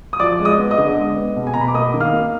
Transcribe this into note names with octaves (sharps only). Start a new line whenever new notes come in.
D#6
F3 D5 D6
G#3
D#5 D#6
B3
D#5 D#6
D3
G#3
B3
B2
G#5
B2 A#5
B5
D6
A#3 D#5 D#6
D#3
F5 F6
A#3